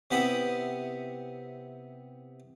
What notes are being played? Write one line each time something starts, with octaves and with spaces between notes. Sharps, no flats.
C3 B3 E4 G4 B5 D#6